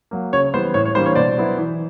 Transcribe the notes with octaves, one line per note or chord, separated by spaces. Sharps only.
F#3 A#3
C#3 C#5
E3 G3 B3 C5
A2 C#5
C#5
E3 G3 A#3 D4 C5
C#5
B2 C5 D5
F#3 B3 E4
E3